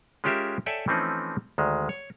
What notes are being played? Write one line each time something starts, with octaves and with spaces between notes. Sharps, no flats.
G#3 C#4 F4 G4 A#4 E5
A4 C#5 D5 E5 G5 G#5
E3 F3 A3 C4 C#4 D#4
D2 D#3 G#3
C#5